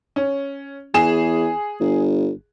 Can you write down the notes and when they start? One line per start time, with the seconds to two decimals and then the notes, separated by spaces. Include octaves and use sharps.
0.16 C#4
0.94 E2 G#4 E7
1.80 G1